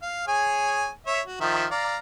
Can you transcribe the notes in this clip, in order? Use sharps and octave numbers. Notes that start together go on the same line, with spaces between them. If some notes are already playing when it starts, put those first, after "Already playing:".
F5
G#4 C#5 G#5
C#5 E5
F#4
D#3 F3 E5
D5 F5 A#5